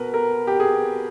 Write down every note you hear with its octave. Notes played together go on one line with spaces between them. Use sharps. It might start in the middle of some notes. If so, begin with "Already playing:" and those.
Already playing: B2 A#4 B4
A#4
G4
G#4